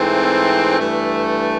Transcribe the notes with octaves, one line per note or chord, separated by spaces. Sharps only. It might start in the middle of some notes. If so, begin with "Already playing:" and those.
Already playing: G#2 E3 A3 C4
G2 E3 A3